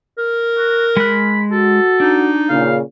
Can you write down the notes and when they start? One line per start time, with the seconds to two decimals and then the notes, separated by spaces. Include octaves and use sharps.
0.18 A#4
0.57 F#4
0.97 G#3 B5 F#6
1.52 F#4 A4
2.00 D4 D#4
2.49 A#2 C#3 F5